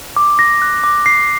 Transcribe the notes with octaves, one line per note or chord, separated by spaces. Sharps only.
D6
A#6
F#6
D6
C7